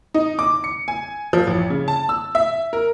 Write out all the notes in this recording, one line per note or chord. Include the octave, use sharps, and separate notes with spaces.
D#4
D6
C#7
G#5
F3
A1
C#3
A5
E6
E5
A#4